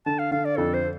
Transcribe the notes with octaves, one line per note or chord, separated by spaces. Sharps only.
D3 A5
F5
D3 F5
D5
F2 A4
C5